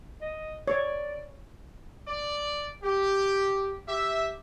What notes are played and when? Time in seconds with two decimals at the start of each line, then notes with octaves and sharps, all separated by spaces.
0.22 D#5
0.68 C#5 D5
2.07 D5
2.83 G4
3.89 G4 E5